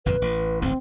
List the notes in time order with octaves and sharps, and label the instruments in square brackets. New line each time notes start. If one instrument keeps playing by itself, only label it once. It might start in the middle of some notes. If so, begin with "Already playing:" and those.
[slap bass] G1 F2 A#2 [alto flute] B4
[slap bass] A1
[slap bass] D1 A1 G#2 [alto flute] C4